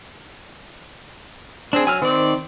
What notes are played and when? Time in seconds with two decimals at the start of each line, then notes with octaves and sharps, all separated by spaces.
1.73 C4 D4 G#4
1.87 F#3 G#5 E6 F6
2.02 D#3 C4 D5